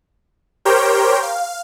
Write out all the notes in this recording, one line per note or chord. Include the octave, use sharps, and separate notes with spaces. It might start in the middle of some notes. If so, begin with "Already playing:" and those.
G4 A#4 C5 C#5 G5
F5